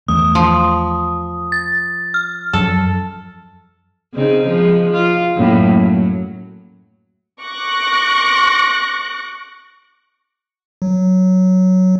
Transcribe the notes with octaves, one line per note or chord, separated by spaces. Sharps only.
E2 E3 A3 D#6
F3
A6
F6
F#2 F3 F#3 A4
C#3 C4 D#4
F3 G#3
F4
F#2 A2 A#3
F#3
C#6 D6 F#6 A#6
F#3